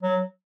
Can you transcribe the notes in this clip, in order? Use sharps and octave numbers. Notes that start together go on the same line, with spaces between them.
F#3